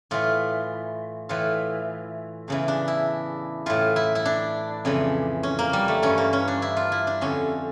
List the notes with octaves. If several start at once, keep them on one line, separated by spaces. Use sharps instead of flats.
A2 E3 F4
A2 E3 F4
E2 C#3 E3
D4
E4
A2 E3 F4
E4
E4
D4
F2 C#3 E3
C#4
A#3
G3
A3
G2 E3 C#4
A#3
C#4
D4
E4
F4
E4
D4
F2 D3 C#4